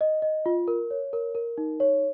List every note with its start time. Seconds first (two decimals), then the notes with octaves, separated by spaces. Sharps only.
0.01 D#5
0.22 D#5
0.46 F4
0.68 A#4
0.91 C#5
1.13 A#4
1.35 A#4
1.58 D#4
1.80 C#5